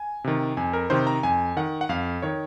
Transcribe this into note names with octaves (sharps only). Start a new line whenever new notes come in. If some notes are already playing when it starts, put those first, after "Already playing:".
Already playing: G#5
C3 D#3
F2 G#5
A#4
C3 D#3 C5
A#5
F2 G#5
D#3 F#5
F#5
F2 F5
D#3 C#5